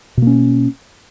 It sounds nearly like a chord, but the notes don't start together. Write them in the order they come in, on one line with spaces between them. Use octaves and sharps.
B2 A#3 C#4